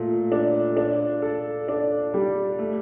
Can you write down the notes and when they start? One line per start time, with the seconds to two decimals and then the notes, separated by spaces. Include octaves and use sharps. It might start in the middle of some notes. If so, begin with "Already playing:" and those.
Already playing: A#2 A3
0.32 D4
0.77 D4
1.22 A4
1.68 D4
2.14 G3
2.59 A3